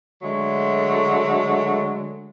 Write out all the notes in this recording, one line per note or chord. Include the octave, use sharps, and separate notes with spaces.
D3 F#3 G#3 A3